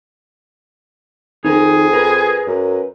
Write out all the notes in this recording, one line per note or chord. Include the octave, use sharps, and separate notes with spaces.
F2 D#4 G#4 A#4
A#4 B4
F#2